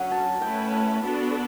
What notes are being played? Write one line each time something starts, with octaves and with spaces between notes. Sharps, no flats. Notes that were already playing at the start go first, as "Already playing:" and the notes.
Already playing: D3 F#3 C#4 F#5
A5
A3 C#4 E4 B4 G5
A5
B3 D4 F#4 A4 B5